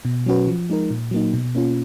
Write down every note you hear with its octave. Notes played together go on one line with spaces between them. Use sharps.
B2
F#3 C#4 F#4 B4
F3
G#3 D#4 A#4
A#2
F#3 A#3 D#4
B2
A#3 C#4 F4